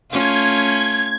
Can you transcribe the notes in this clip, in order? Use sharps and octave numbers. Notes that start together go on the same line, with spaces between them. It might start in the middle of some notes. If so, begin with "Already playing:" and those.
A3 C#4 F4 G#6